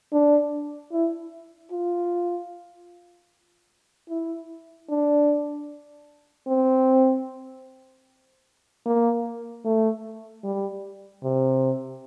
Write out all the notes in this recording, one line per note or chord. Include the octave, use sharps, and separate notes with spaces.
D4
E4
F4
E4
D4
C4
A#3
A3
G3
C3